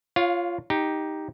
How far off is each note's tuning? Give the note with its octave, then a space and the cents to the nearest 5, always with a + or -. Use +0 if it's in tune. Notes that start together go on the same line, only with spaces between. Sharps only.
F4 -10 C#5 +0 F5 +20
D#4 +5 G4 +0